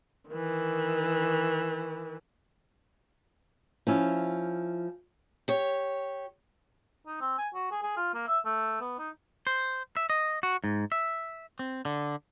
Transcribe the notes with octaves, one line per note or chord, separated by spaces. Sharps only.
D#3 E3
F3 C#4 E4
G4 C#5
D#4
C4
G#5
F#4
G#4
G#4
F4
A#3
E5
A3
B3
D#4
C5
E5
D#5
F#4
G#2
E5
C4
D3